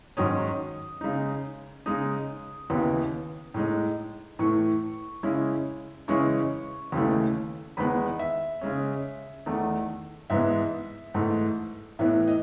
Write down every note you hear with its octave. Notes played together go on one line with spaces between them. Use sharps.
G#2 D#3 F#3 C#4 D#6
C#3 G#3 D#4
C#3 G#3 D#4 D#6
D#2 C#3 E3 B3
A2 G#3 D#4
A2 E3 A3 C#6
C#3 G#3 C#4 E4
C#3 E3 G#3 C#4 E4 C#6
D#2 C#3 E3 A3
E2 D#3 G#3 B3 B5
E5
C#3 G#3 C#4
E2 D#3 A3
G#2 E3 G#3 B3 E5
G#2 E3 A3
A2 E3 B3 E5
D#5